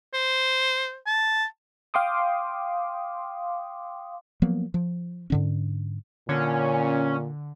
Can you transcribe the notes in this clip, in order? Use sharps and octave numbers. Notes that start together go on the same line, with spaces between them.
C5
A5
F5 G5 C6 D6 D#6
F3 F#3 A#3 B3
F3
G#2 D3 C#4
A#2 D3 C#4